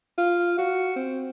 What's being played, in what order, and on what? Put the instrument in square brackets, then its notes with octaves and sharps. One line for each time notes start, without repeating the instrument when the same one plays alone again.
[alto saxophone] F4
F#4
C4